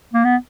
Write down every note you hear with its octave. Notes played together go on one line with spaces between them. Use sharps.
A#3
B3